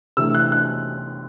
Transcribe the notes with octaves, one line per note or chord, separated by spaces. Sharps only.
C3 E3 A3 D4 E6
F#6
F#6